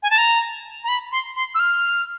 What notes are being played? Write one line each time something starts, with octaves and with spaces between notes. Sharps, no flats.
G#5
A5
A#5
A#5
B5
C6
C6
E6
F6